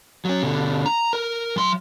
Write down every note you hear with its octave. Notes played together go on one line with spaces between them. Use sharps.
F#3 C#4
B2 D3
A#5
A#4
F#3 C6